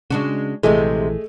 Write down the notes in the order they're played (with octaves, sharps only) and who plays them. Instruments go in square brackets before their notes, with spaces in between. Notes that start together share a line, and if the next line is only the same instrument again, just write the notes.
[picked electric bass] C#3 [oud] G#3 D4 F#4
[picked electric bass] A#1 E3 [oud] C3 G#3 [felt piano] A3 G#4 D#5